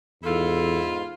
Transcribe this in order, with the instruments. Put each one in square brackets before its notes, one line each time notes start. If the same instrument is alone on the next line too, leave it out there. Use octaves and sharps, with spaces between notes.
[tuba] E2 [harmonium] G#2 [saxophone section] E4 F4 [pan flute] A4